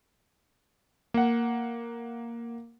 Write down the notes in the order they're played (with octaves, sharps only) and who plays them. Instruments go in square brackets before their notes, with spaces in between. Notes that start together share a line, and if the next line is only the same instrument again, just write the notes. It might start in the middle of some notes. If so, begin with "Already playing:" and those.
[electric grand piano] A#3 F#5